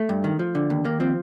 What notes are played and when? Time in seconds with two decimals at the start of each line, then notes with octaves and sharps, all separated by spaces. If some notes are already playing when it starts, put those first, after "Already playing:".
Already playing: A3
0.09 G2
0.24 D#3
0.39 F3
0.55 D3
0.70 D#2
0.84 D#2 A#3
1.00 F3 C4